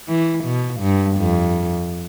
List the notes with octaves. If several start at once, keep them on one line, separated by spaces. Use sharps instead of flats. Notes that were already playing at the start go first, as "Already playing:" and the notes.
E3
B2
G2
F2